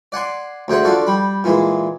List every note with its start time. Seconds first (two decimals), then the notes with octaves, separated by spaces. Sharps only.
0.12 D5 F#5 G#5 C6
0.68 D2 C4 G#4 E5 F#5
0.84 D3 D4 F4 F#4 A4
1.07 G3 B5
1.44 A#2 E3 G#3